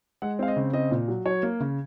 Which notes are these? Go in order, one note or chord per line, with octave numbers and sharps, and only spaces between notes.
G#3 F#5
C4 F5
D#5
C#3
C4 D#5
A#2
F#3
F#3 C#5
A#3
C#3